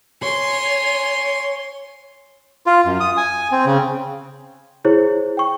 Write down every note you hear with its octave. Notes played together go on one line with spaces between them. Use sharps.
C#5 G#5 C6
F4
F#2
D#6
G#5
C4
C#3
E4 G#4 C5 C#5
G5 C#6